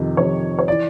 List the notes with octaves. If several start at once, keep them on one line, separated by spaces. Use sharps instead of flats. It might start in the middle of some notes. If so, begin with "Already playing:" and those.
Already playing: F2 C3 D#3
F2 C3 D#3 C#5
C#5
E3 D5